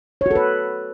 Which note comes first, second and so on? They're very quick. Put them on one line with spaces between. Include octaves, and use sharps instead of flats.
C#5 F#4 A4 B4